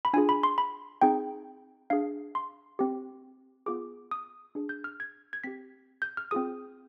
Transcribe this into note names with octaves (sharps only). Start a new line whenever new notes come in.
B5
D4 F4 G#4 G#5
B5
C6
B5
C4 D#4 G#4 G5
D4 G#4 F5
C6
C4 G4
B3 F4 G#4 D6
D#6
D4 G#4
G6
F6
G#6
G#6
C4 G4 B6
G6
F6
C4 F4 G#4 D#6